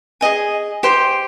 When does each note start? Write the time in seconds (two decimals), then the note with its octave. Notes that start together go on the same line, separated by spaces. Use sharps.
0.21 G#4 D#5 G#5
0.83 G4 C5 G5 C6